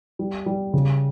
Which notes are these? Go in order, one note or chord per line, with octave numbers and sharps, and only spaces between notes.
G3
G3
C#3